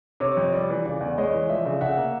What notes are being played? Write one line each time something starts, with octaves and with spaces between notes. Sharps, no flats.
C3 C#5
F2
G3 D5
E3
C#3 D5
E2
G#3 C#5 D#5
E3
F3 D5 E5
C#3
C#3 E5 F#5
A#3